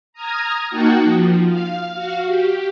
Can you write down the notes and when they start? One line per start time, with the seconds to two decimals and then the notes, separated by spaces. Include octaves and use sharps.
0.13 A#5 D#6 F6 G#6
0.68 A#3 D#4 F#4 F#5 G5 A5
1.04 F3
1.47 F5
1.91 F#4 F5
2.26 G4